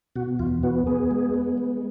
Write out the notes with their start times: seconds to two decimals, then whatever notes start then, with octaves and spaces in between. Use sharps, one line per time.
0.16 B2 F#4
0.39 E2 F4
0.63 B3 F#4
0.87 B3 G#4
1.11 G#3
1.34 B3
1.58 G#3